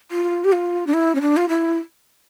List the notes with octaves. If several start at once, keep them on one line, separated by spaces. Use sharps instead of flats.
F4
G4
F4
D4
E4
C#4
D4
F4
E4